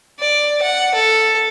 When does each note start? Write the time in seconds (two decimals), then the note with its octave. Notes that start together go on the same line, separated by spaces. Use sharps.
0.20 D5
0.62 F#5
0.94 A4